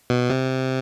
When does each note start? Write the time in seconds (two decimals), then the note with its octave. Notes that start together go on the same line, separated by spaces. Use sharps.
0.10 B2
0.30 C3